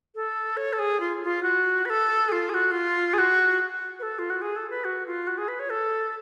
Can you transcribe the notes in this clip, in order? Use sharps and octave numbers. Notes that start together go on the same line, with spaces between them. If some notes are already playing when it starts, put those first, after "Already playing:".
A4
C#5
A4
G#4
F4
F4
F#4
B4
A4
G#4
F4
G#4
F#4
F4
G#4
F#4
B4
A4
F4
F#4
G#4
A4
B4
F#4
F4
F#4
G#4
B4
C#5
A4